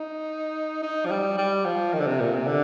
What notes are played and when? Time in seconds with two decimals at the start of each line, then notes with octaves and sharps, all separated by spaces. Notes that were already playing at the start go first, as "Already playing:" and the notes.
Already playing: D#4
0.83 D#4
1.06 F3
1.11 G3
1.38 G3
1.65 F3
1.93 D#3
2.00 D3
2.07 C3
2.20 A#2
2.34 C3
2.47 D3